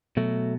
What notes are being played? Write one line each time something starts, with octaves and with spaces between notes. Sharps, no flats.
B2 F#3 A3